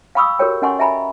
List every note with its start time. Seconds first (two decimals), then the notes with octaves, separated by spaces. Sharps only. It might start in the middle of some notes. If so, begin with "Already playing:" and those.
0.15 F5 G5 B5 C#6 D#6 E6
0.39 F#4 G4 A4 A#4 C#5 G5
0.62 C#4 D#5 F#5 G#5 C6 C#6
0.79 D#5 E5 G5 G#5 A#5 B5